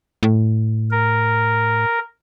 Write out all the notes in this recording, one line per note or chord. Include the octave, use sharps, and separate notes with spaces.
A2
A#4